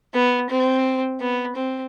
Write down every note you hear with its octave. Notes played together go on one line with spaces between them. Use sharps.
B3
C4
B3
C4